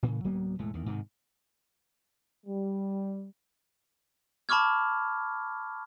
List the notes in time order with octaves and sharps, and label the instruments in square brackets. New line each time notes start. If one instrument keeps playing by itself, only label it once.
[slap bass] A2 C#3 E3
D1 F#3 A#3 B3
E1 A2 G#3 A3
E2 D#3
G#2 C3 D#3
[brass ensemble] G3
[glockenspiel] A5 B5 C#6 D6 F6 G#6